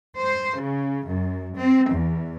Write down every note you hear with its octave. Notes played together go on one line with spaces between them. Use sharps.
C5
C#3
F#2
C4
E2